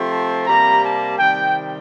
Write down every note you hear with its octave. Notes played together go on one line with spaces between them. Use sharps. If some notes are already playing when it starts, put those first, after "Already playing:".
Already playing: C3 F3 A3 C4
A5
C3 G3 A#3 A#5
A5
C3 D#3 G3 G5